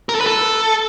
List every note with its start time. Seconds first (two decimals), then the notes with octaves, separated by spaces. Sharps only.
0.09 A#4
0.15 A4
0.21 B4
0.26 A4